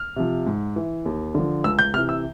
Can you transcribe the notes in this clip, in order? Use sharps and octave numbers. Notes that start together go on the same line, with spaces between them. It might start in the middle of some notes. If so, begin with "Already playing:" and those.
Already playing: F6
C3 F3
G#2
E3
D#2
D3 F3
C#2 E6
G6
C3 E3 F6
E6